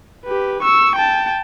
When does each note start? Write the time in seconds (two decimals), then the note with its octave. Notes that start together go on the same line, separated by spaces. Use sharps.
0.25 G4 B4
0.62 C#6 E6
0.95 G5 A5